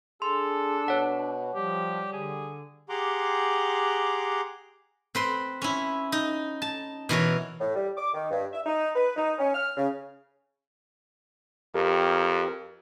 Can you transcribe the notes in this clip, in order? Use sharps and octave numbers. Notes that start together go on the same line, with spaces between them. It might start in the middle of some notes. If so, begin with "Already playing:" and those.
D4 G#4 A4 C6
B2 C#5 F#5
F3 G3 G4
D3 G#4
G4 G#4 F#5 A#5 C6 D6
C4 B4 C6
C#4 E4
D#4
A5
B2 E3 A#4 C#5
A2
G3
D6
D#3
G2
E5
D#4
B4
D#4
C#4
F6
C#3
F2 G4 A#4